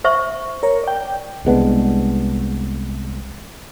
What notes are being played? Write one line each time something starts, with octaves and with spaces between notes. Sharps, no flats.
C5 E5 C#6
A#4 C#5
D5 G5
C2 G#3 B3 D4